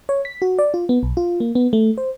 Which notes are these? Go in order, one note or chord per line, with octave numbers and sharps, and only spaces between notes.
C#5
B6
F#4
D5
F4
B3
B1
F4
A#3
B3
A3
C5